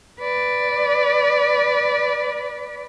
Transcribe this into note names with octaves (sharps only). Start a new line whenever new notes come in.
B4 D5